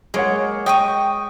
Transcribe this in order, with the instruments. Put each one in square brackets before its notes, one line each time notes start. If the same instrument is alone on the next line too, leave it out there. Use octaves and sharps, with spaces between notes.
[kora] G#3 C#5 F#5 [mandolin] A#3
[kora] D#5 [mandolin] G5 C#6 D#6